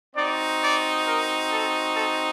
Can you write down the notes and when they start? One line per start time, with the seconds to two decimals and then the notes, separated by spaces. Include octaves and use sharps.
0.15 C4 D#4 F#4 D5
0.60 D5
1.05 A#4
1.50 A4
1.95 A4